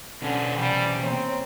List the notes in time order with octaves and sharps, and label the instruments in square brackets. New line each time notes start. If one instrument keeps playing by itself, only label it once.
[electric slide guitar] B2 C#4 [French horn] D3
[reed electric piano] C3 E3 [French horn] G3
[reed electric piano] A#3 C#5 A#5 [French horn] C4